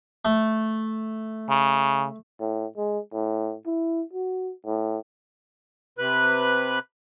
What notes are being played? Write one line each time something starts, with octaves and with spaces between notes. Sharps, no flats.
A3
C#3
A2
G#3
A2
E4
F#4
A2
C3 B4 F#6